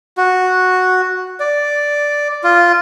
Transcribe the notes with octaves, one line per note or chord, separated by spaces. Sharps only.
F#4
D5
F4